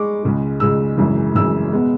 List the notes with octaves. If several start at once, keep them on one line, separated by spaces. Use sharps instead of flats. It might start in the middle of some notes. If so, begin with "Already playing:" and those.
Already playing: G#3 C#6 D6
C#2 C#3 G#3
C#2 C#3 G#3 E6
G#1 F#2 C#3 E3
G#1 F#2 C#3 E3 E6
B2 G#3 B3